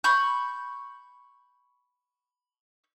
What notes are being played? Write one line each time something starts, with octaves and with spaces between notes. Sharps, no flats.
B5 C#6 G6